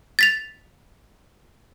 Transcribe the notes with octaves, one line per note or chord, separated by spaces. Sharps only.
A6 B6 F7